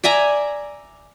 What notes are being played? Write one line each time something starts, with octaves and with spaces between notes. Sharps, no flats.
D5 E5 G#5 A#5